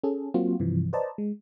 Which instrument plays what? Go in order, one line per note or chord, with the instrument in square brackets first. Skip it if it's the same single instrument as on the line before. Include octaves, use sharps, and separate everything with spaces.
[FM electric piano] C#4 G#4 A4
F#3 A#3 C4 F4 F#4
G2 C3 E3 F3
B4 C5 D5 D#5 A5 A#5
G#3